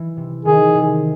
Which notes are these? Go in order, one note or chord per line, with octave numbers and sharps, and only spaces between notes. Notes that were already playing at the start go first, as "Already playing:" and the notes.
Already playing: E3
C3
D#3 G#4
C3